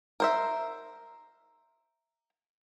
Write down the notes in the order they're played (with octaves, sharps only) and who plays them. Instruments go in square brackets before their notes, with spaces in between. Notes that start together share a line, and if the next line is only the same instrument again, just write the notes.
[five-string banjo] A#4 C5 E5